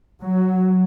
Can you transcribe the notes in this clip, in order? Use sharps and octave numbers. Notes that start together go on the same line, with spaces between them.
F#3